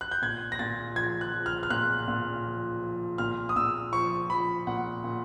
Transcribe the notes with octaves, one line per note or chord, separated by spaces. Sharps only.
F#6
G6
A#2 G#6
A#6
A#2 A6
F3 G#6
F#6
F3
F6
F6
A#2 F#6
A#2
F3
F3
A#2 F6
D#6
A#2 E6
F3 C#6
F3 B5
A#2 F#5
A#2